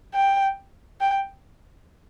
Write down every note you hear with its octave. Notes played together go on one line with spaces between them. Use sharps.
G5
G5